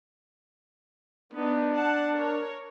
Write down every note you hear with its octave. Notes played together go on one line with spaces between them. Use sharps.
B3 D4 D#4
F#5 A5
A#4 C#5